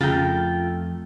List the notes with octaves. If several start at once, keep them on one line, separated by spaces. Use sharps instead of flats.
F2 C#3 A3 F4 G5 A#5